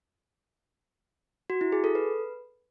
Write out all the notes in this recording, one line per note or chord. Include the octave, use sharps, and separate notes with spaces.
F#4
E4
G#4
A4
B4